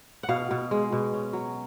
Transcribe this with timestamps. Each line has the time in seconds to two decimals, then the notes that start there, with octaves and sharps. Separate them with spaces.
0.23 F#5
0.29 B2 F5
0.51 B2
0.71 G#3
0.92 B2
1.13 C#4
1.33 F#3